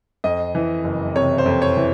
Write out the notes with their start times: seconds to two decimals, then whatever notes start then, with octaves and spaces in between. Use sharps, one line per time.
0.24 F2 D#5
0.55 E3
0.84 F#1
1.16 C3 C#5
1.38 C5
1.46 F2
1.62 C#5
1.77 E3